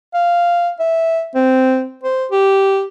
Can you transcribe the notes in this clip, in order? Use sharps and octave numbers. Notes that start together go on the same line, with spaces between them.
F5
E5
C4
C5
G4